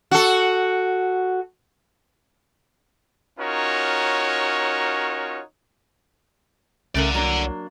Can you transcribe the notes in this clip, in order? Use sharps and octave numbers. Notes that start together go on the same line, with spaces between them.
F#4 A4
C#4 D#4 F4 F#4 A#4 C#5
C2 C#3 A3 A#4 D5 F#5
F#3 A#3 D4